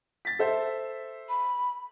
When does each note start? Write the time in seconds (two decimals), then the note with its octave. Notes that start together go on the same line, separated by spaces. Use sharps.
0.25 A6 B6
0.39 A4 C5 E5
1.29 B5